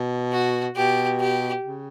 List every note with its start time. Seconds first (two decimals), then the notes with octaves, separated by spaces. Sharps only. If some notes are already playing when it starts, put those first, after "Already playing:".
Already playing: B2
0.33 F#4
0.76 B2 G4
1.20 G4
1.64 C#3